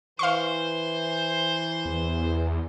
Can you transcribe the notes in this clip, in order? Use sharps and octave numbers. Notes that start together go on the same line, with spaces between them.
E3 C5 F5 C6 C#6
E2